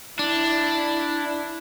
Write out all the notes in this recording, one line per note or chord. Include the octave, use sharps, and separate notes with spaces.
D4 E4